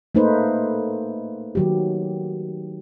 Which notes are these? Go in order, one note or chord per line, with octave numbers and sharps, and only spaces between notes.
A3 A#3 D#4 B4 C5
D#3 F#3 G4